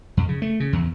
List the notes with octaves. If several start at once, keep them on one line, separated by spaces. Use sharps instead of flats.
F2
C#3
A3
C#3
E2